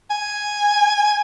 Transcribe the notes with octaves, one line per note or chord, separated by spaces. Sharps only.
G#5